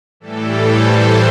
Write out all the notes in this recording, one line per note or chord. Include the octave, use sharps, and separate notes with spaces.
A2 E3 G3 A4
C5